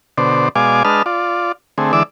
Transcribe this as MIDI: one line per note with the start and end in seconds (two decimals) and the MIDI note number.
0.18 0.49 47
0.18 0.49 50
0.18 0.49 72
0.18 0.49 74
0.56 0.83 47
0.56 0.83 56
0.56 0.83 74
0.56 0.83 77
0.56 0.83 80
0.56 0.83 86
0.85 1.02 56
0.85 1.02 62
0.85 1.02 71
0.85 1.02 75
0.85 1.02 81
0.85 1.02 89
1.06 1.52 65
1.06 1.52 74
1.78 1.92 50
1.78 1.92 57
1.78 1.92 60
1.78 1.92 68
1.93 2.03 50
1.93 2.03 52
1.93 2.03 56
1.93 2.03 74
1.93 2.03 86
1.93 2.03 88